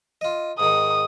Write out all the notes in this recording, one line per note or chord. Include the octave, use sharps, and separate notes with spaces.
F4 D#5
G#2 D#3 D#6